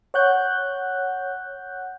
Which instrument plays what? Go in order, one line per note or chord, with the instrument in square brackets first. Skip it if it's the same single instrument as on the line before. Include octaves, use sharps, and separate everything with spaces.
[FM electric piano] C#5 F#5 F#6 G6